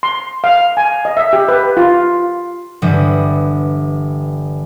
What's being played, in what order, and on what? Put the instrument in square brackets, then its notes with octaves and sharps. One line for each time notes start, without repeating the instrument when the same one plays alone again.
[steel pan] C6
F5
G#5
D#5
E5
G4
B4
F4
[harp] G1 E3 G3 D#6